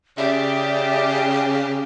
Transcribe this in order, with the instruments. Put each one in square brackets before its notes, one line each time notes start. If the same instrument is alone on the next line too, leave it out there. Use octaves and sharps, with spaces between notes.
[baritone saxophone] C#3 [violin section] G4 [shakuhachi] D5 [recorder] E5